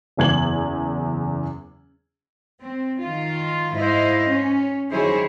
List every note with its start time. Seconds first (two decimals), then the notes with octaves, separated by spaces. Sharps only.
0.17 F#1 E2 G#6 F#7
2.60 C4
3.00 D#3 F4
3.74 G#2 E4 C5 D#5 F5
4.28 C#4
4.91 D#3 F#3 E4 G#4 C5 C#5